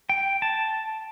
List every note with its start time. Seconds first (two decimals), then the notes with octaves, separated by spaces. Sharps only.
0.09 G5
0.42 A5